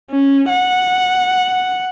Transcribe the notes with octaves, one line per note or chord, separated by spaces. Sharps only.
C#4
F#5